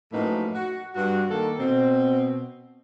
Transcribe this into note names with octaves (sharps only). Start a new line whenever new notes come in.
F#2 A2 F3 A#3 D#4 B4
F#4
G2 F#4
D#3 A#3 A4
B2 C4